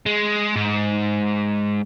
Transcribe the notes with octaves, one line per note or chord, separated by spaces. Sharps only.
G#3
G#2